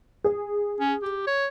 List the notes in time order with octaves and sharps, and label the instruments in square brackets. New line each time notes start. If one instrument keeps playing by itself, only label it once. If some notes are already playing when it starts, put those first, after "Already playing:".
[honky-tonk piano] G#4
[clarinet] C#4
G4
C#5